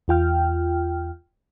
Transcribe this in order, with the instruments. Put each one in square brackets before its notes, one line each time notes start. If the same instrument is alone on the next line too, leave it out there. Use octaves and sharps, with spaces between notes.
[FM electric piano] E2 F4 G5 F6